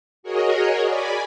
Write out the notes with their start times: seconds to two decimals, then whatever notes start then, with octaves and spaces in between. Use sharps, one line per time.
0.23 F#4 G#4 A#4 C#5 D#5
0.85 D5 G#5 B5